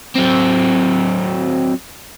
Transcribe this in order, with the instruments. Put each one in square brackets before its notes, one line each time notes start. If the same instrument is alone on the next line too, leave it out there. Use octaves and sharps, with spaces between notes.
[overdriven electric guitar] F#3 C4